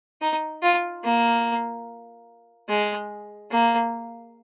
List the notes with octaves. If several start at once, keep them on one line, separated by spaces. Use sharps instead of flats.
D#4
F4
A#3
G#3
A#3